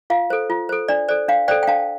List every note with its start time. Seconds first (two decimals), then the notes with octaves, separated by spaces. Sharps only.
0.10 F4 F5
0.30 A4 C5
0.50 F4
0.69 A4 C5
0.88 D4 D5
1.09 A4 C5 D5
1.28 D4 F5
1.48 A4 C5 D5 G5
1.63 G5
1.67 D4 F5 A5